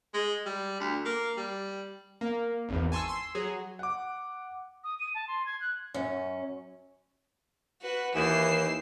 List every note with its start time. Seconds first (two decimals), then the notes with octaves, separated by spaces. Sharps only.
0.14 G#3
0.46 G3
0.80 D2
1.05 A#3
1.37 G3
2.21 A#3
2.69 G#1 E2
2.92 G#5 A5 C6 C#6 E6
3.08 C6 E6
3.35 F#3 G#4
3.79 F#5 D6
4.84 D#6
4.99 D#7
5.14 A5
5.27 C6
5.46 G#6
5.60 F#6
5.94 F#2 C#4
7.82 F#4 B4
8.15 D#2 E3 C7 E7